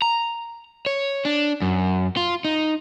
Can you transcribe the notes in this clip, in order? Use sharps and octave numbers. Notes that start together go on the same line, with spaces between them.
A#5
C#5
D4
F#2
F4
D#4